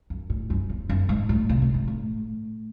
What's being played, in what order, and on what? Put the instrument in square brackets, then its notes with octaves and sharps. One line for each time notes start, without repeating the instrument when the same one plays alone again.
[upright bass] F#2
A2
F#2
E2
F#2
G#2
A2
C3
A2
G#2
A2